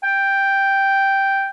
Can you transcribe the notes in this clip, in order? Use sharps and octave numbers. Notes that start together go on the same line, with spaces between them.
G5